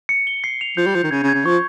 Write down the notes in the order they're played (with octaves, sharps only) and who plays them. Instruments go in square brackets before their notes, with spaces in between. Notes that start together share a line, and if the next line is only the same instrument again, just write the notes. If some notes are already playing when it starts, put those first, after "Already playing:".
[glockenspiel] C#7
G7
C7
F7
[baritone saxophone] F3 [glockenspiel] G6
[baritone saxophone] G3
[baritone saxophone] F3 [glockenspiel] G6
[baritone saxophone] D#3
[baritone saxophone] C#3 [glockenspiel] G#6
[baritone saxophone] C#3
[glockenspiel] G#6
[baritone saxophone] C#3
[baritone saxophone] F3 [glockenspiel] C#6